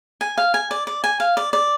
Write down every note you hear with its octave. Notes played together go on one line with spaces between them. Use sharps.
G#5
F5
G#5
D5
D5
G#5
F5
D5
D5